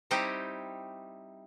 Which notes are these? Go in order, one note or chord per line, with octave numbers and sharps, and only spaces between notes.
G3 C4 D#4 E4 G4